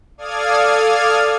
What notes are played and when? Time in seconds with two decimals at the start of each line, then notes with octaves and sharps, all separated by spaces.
0.18 A4 D5 F5 D#6 F6 G#6